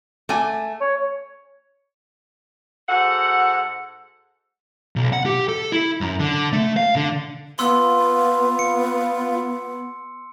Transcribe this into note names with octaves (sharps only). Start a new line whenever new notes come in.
A3 G#5
C#5
G#2 F#4 A4 F#5
B1
F#5
G4
A4
E4
F#2
D3
A3
F5
D3
B3 F4 C6 E6
C#7